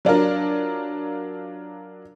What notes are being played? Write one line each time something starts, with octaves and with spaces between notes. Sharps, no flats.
F#3 D4 F4 A#4